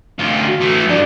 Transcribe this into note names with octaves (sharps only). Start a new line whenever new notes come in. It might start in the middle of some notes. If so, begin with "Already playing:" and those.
D2 F4
F#4
E3 A3
G2 D3 D5